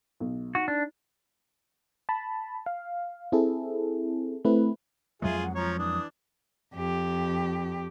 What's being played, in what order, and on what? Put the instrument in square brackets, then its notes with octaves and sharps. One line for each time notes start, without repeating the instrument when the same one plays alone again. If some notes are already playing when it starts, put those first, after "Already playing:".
[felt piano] B1
[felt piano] D#4 [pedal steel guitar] F#4
[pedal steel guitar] D4
[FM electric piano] A5 B5
F5
C4 E4 G#4 A4
A3 C4 E4 B4
[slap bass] F2 F#3 G#3 [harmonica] F4 G#4 [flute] E5
[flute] F#5
[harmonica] F3 C#5 [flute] A#5
[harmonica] E3 D4 [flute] D#6
[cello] F2 G4